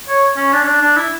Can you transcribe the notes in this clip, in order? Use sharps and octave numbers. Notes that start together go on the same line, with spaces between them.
C#5
C#4
D4
C#4
D4
D4
E4